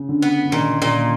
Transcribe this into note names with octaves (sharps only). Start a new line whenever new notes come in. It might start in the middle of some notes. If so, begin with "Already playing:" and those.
Already playing: C#3
D3
B3
D3
A#2 D#3
A#2